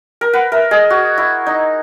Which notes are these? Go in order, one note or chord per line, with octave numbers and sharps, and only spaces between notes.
A#4
B4 F#5
A#4 E5
G#4 D#5
F#4
E4
D#4